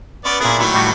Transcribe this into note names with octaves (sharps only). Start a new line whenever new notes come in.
B3 C#4 B4 D5
A#2 A#3 B3 E4 G#4
D#3 F#3 A3 E4 C#6
A2 G3 F#4